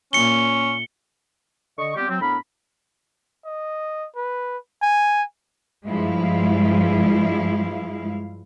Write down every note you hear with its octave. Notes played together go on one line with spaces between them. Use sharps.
A#2 A#3 C#4 C#7 G7
D3 D#5 C#6
G3 B3 C4 F4 G4
F#3 C4
A2 B3 D4 A#4 B5
D#5
B4
G#5
G2 F3 G#3 E4 F5